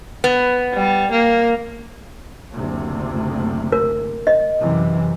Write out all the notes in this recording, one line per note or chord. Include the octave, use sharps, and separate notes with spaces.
B3
G3
A#3
F#1 D2 C3
A#4
D#5
F#2 C3 E3